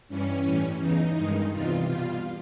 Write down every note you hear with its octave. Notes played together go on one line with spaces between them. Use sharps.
G2 E3 G3 C#4
A2 E3 G3
E2 C#3 E3 D#4
G2 D#3 G#3
E2 C3 E3 G3 F4
B2 G3 F4